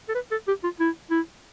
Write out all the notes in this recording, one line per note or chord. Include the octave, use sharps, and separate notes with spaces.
A4
B4
A4
G4
F4
E4
E4